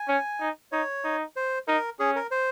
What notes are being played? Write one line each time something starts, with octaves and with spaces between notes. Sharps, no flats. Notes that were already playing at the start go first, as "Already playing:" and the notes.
Already playing: G#5
C#4
D#4
D#4 C#5
D#4
C5
D#4 A#4
C#4 G#4
A#4
C5